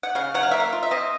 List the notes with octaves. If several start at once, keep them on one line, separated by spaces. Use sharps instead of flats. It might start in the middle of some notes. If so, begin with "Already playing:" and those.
F#5
C#3 F5
F#3 F#5
F5
A#3 E5
F5
F4
E5
C4 D#5